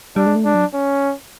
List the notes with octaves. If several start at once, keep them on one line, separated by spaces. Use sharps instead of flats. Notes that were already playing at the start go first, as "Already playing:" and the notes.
G3 D4
G#3
A3
G#3 D4
F#3
C#4